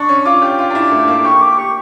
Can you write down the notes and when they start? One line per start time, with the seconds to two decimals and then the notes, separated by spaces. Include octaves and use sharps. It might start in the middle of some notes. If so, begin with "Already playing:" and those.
Already playing: D4 C#6
0.09 C#4
0.25 F4 D6
0.42 G4
0.59 F4
0.70 D4
0.75 E4
0.91 A3
1.08 A#3
1.25 G4 C#6
1.42 D6
1.58 G4 C#6